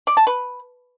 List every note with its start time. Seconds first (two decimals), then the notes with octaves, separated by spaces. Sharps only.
0.07 D5
0.17 A5
0.27 B4